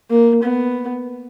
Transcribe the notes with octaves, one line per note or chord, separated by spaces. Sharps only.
A#3
B3